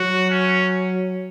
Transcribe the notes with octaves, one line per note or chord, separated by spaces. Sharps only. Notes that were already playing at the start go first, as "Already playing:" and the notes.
Already playing: F#3 F#4
C#4